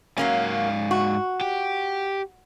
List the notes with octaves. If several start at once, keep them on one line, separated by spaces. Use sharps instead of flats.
G#2 F#3 A#3 C#4 F5
F#4
G4